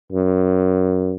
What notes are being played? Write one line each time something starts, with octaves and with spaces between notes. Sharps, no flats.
F#2